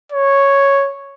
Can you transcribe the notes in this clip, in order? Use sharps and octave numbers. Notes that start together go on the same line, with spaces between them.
C#5